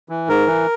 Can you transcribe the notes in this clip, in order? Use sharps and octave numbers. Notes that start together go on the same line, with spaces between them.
E3
G#2 A#4
E3